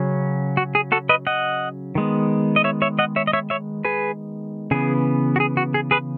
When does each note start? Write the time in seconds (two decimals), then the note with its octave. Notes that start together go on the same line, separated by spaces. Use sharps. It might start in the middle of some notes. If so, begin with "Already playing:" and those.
Already playing: C#3 F#3 C#4
0.57 F#4
0.75 G#4
0.92 F#4 A4
1.09 B4 D#5
1.27 D#5 F#5
1.95 D#3 G#3 B3
2.56 D#5
2.64 C#5 E5
2.82 C#5 E5
2.99 D#5 F#5
3.16 C#5 E5
3.27 D#5
3.33 C#5 E5
3.50 C#5 E5
3.85 G#4 B4
4.71 C#3 E3 B3 G#4
5.36 F#4
5.40 G#4
5.57 F#4
5.74 G#4
5.91 G#4 B4